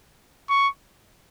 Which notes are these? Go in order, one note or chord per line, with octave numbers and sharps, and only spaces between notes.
C#6